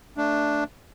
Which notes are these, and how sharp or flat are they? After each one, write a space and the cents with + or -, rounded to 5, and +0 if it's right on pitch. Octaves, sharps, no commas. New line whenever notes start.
A3 +10 D4 +0